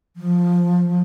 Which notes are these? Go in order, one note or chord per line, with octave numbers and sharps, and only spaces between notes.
F3